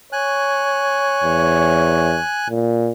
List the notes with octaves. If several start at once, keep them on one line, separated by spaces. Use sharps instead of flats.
C#5 G#5 F#6
E2
A#2